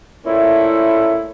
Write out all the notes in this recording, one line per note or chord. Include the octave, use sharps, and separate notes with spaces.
A#2 A3 C#4 E4